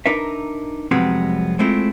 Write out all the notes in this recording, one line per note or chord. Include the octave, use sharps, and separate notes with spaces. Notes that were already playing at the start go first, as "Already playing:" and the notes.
D4 D#4 A#4 B4 E5
C2 F2 F#3 G#3 B3 C4
G#3 A3 C4 E4 F4